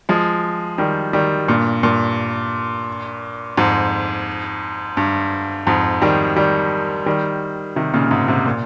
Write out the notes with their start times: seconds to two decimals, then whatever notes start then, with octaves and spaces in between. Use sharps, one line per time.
0.09 F3 G#3
0.78 D#3 G3
1.13 D#3 G3
1.48 G2 A#2
1.83 G2 A#2
3.57 F2 G#2
4.97 G2
5.67 F2 G#2
6.02 D#3 G3
6.36 D#3 G3
7.06 D#3 G3
7.76 C3 D#3
7.94 A#2 C#3
8.11 G#2 C3
8.28 G#2 C3
8.46 A#2